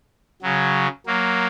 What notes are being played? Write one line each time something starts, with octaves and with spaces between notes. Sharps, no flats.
C#3 F#3
F#3 A#3